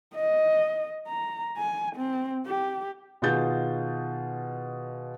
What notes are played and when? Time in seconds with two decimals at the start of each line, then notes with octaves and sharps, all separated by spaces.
0.15 D#5
1.08 A#5
1.57 G#5
1.96 C4
2.46 G4
3.22 B2 D#3 F4 G#4 G6 A6